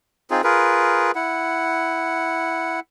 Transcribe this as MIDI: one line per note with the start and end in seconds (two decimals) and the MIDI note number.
0.31 0.42 60
0.31 0.42 63
0.31 0.42 65
0.31 0.42 68
0.44 1.11 65
0.44 1.11 68
0.44 1.11 70
0.44 1.11 71
1.15 2.80 64
1.15 2.80 78